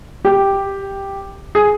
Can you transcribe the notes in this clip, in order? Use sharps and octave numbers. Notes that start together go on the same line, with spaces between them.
G4
G#4